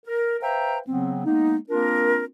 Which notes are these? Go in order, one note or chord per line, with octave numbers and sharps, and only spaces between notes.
A#4
B4 C5 E5 F5 G5 A#5
C#3 F#3 B3 C4
G#3 A#3 B3 D#4
A#3 C4 D4 F4 A#4